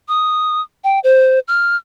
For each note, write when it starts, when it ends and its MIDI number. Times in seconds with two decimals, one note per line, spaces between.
0.08 0.61 87
0.84 1.00 79
1.04 1.39 72
1.48 1.76 89